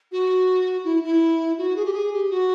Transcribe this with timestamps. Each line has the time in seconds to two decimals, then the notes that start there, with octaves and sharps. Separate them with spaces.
0.12 F#4
0.84 E4
1.03 E4
1.58 F#4
1.76 G#4
1.85 G4
1.93 G#4
2.13 G4
2.30 F#4